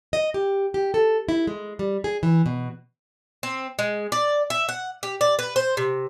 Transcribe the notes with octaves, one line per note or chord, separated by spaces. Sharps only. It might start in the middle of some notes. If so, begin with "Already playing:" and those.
D#5
G4
G4
A4
E4
G#3
G3
G#4
E3
B2
C4
G#3
D5
E5
F#5
G4
D5
B4
C5
C3